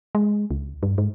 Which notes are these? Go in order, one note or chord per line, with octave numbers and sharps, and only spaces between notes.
G#3
C#2
G2
G#2